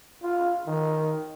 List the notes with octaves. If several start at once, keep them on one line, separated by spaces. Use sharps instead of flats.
F4
D#3